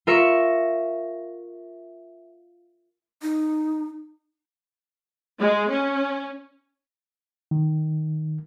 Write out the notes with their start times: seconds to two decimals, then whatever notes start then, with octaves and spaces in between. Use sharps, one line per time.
0.07 F4 A#4 E5 C#6 C#7
3.22 D#4
5.39 G#3
5.71 C#4
7.51 D#3